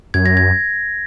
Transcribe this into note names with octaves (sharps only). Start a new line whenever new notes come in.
F#2 G#6
A#6
G#6